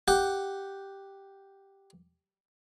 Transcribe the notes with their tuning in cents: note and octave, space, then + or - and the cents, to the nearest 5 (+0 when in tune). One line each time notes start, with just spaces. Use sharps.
G4 +0 F#5 +0